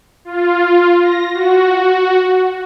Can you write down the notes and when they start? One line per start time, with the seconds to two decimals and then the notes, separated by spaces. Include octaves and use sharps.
0.25 F4
1.01 A#6
1.33 F#4